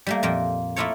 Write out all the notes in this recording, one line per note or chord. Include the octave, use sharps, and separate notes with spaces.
G3 A3 A#3
F2 A#2 A#3 G5
A3 A#3 E4 F4 A4 C#5